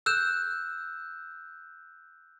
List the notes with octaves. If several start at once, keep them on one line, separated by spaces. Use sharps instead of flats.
E6 F#6 G6 E7